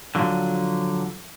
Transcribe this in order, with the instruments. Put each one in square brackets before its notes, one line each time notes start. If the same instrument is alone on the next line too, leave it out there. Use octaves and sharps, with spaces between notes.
[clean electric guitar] D3 F3 F#3